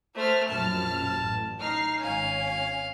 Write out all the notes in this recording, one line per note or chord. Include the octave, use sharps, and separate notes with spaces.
A3 C5 F6
A#1 F#2 A5 F6
A1
D#4 F6 C7
G#1 C#4 F5 G#5